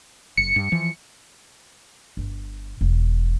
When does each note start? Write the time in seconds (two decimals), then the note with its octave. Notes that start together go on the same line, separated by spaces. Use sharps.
0.37 F#1 C#7
0.56 G2
0.72 E3 F3
2.17 G1
2.81 E1